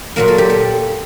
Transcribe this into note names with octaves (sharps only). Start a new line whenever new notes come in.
A#2 F#3 A#3 A#4
A4
G4
A4